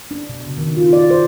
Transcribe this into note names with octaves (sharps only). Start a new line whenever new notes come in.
D4
B2
C#3
D#3
F4
D5
C5